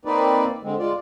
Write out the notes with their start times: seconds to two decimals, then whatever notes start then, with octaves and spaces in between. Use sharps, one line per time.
0.05 A#3 C4 D#4 B4 D5
0.63 D3 G#3 C4
0.79 G#3 F4 D5